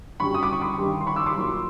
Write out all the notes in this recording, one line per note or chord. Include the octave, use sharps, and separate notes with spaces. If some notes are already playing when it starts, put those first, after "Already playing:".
F#2 D3 G3 B5 C#6
D#6
D6
C#6
C6 D6
G2 D#3 G3
C6
B5 C#6
D6 E6
C6 D6
A#2 F#3